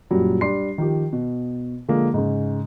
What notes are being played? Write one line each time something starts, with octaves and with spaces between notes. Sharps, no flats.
F#2 A#2 F#3 G3
G3 D4 C6 C7
D#3 F3 G4
B2
D3 F3 G#3 A#3
G#2 C#3